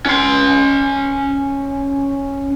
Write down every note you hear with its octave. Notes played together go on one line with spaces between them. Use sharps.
C#4 C6